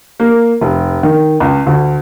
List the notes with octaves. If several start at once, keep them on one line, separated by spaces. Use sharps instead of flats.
A#3
F1
D#3
C#2
D2